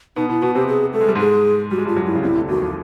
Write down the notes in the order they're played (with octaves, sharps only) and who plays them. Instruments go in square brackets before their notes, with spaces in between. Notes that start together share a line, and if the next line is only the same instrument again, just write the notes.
[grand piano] B2 B3 [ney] D#4
[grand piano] B2 B3 [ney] E4
[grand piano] B2 B3 [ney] F#4
[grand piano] C3 C4 [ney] G4
[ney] G#4
[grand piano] A3 [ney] A4
[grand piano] G#3
G3
[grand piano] G#2 G#3 [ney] G#4
[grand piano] G3 [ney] F#4
[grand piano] G#3
G2 G3
[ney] F4
[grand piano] F#2 F#3
[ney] E4
[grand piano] C#3
[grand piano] C2 C3 [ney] E4
[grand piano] D2 D3
[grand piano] D#2 D#3 [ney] F#4
[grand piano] F3